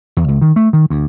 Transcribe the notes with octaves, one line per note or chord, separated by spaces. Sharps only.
E2
C#2
D#3
A3
D#3
D2